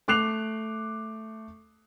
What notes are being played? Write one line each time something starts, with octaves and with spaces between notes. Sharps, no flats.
A3 D6 F#6 C7 F7